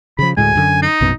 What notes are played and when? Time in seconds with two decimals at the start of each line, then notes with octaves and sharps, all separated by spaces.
0.19 C#3 F3 B5
0.37 D2 A2 G#3 G#5
0.56 F#2 D3
0.82 D#4
1.01 A#1 F#2 B2